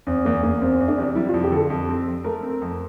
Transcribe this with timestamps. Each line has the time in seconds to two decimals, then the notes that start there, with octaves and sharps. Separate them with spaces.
0.07 E2 C4
0.25 E2 A#3
0.43 E2 A#3
0.61 E2 C4
0.80 E2
0.88 D4
0.98 C3
1.15 G3 E4
1.29 F4
1.34 F2
1.43 G4
1.52 D3 A4
1.70 F2
1.89 C4
2.07 F2
2.24 A3 A#4
2.43 C4
2.62 F2